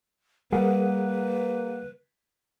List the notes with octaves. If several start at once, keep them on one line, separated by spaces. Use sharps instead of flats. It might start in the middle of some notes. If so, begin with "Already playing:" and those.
G3 A#3 G#4 A#4 B4 F#5